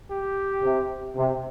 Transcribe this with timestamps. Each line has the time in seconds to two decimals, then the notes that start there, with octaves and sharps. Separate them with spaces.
0.11 G4
0.63 C3
1.15 C3